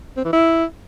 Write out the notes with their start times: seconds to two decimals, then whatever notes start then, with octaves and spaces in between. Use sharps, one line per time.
0.16 C4
0.24 E3
0.33 E4